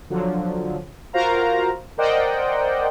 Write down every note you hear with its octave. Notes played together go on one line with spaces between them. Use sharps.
D3 F3 F#3
F4 F#4 A#4 C5 F5 A#5
A#4 C5 D5 D#5 F#5 G5